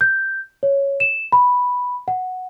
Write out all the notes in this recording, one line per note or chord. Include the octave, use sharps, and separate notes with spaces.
G6
C#5
E7
B5
F#5